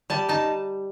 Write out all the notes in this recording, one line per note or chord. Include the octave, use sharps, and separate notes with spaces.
G3 A5
D#4 A5